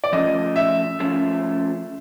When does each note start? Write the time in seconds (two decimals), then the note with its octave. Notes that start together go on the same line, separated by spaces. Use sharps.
0.04 D5
0.12 F3 A3 C#4 F4 G#4 D#5
0.56 E5
1.00 F3 A3 C#4 F4 G#4